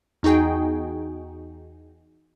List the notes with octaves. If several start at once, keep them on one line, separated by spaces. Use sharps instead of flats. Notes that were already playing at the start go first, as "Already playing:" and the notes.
E2 D#4 F#4 G#4 G5